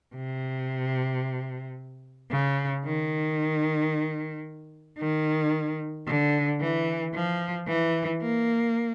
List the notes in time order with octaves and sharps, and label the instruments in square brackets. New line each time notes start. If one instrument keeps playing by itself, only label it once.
[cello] C3
C#3
D#3
D#3
D3
E3
F3
E3
A#3